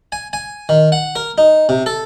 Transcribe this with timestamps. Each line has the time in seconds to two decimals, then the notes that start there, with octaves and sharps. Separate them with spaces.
0.12 G#5
0.33 G#5
0.69 D#3
0.92 F#5
1.16 A#4
1.38 D#4
1.69 C3
1.86 A4